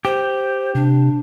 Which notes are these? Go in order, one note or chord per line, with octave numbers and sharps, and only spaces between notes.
G4 C5
C3 D4